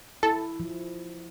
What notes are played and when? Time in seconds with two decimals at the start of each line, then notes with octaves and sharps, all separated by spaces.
0.23 E4 A4
0.60 F3